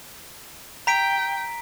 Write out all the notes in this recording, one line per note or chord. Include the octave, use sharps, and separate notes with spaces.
G5 A#5 B6 D7